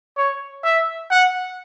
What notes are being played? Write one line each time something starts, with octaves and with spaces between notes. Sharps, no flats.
C#5
E5
F#5